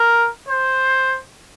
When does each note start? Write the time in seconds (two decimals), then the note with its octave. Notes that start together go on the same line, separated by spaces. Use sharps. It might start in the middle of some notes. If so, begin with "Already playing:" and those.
Already playing: A#4
0.49 C5